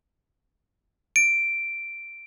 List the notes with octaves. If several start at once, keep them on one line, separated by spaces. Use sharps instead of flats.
D7